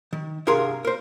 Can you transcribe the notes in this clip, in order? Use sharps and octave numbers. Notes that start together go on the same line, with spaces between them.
D#3
C2 G2 G#4 A#4 C6
A#4 C5